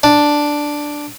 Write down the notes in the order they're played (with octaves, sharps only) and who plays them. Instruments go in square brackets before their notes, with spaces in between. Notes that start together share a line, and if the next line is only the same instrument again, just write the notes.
[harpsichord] D4